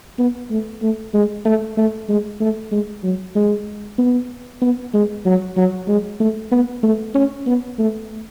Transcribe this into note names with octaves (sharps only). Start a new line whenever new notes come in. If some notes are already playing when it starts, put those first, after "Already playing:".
B3
A3
A3
G#3
A3
A3
G#3
A3
G#3
F#3
G#3
B3
B3
G#3
F#3
F#3
G#3
A3
B3
A3
C#4
B3
A3